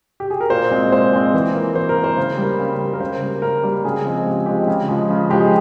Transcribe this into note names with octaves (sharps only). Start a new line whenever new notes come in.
G4
G#4
A#4
A#2 C5
G#3 C4
A#2 C5
G#3 C4
E3
A#3
E3 C5
A#4
A#3
C5
C#3
G3 A#3
C#3
G3 A#3
A#4
C#3 C5
G3 A#3
C#3 A#4
G3 A#3
C#3 G#4
F3 G#3 C4
C#3 G4
F3 G#3 C4 G4
C#3
F3 G#3
C#3
F3 G#3 G4
G#4